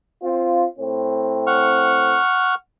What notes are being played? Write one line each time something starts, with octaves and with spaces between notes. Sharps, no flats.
C4 F4
A2 C4
F#5 C#6 F6